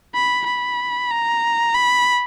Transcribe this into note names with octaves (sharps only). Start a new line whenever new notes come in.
B5
B5
A#5
B5